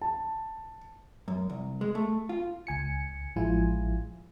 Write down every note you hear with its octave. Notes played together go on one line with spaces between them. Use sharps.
A5
F#2
C2
G#3
A3
F4
C#2 G#5 C#7
A1 F3 G#3 E4 F4 G#5